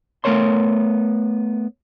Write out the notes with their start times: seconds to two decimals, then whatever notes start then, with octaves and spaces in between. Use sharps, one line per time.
0.24 A3 B3 A#4 C#5 C6